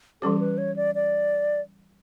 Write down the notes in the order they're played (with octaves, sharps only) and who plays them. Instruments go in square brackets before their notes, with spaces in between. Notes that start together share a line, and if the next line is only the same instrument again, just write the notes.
[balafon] E3 G3 C#4 G4 [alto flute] A4
[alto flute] B4
C#5
D5
D5